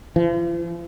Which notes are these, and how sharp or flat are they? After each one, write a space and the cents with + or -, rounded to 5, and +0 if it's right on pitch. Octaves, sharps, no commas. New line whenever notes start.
F3 -45